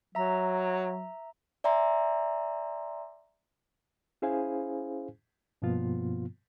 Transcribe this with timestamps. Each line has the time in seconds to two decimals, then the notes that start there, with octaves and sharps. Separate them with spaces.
0.15 F#3 E5 A#5
1.64 D5 E5 G#5 A#5 C6
4.22 C#4 E4 G#4 C5 F5 G#5
5.62 G2 B2 F3 A#3 B3 F4